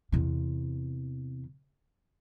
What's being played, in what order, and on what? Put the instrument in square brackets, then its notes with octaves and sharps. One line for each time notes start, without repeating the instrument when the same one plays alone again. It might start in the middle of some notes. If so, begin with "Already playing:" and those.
[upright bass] E2 C3